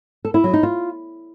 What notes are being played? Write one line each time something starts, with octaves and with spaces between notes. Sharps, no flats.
A4
E4
F#3
D#4
F4